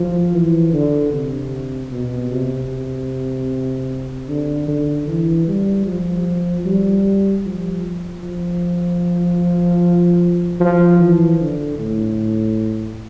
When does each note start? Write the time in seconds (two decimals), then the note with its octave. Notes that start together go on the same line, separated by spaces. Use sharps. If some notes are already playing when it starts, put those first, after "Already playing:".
Already playing: F3
0.34 E3
0.73 D3
1.13 C3
1.92 B2
2.31 C3
4.29 D3
4.68 D3
5.08 E3
5.48 G3
5.87 F3
6.66 G3
7.45 F3
8.23 F3
10.60 F3
11.00 E3
11.40 D3
11.79 A2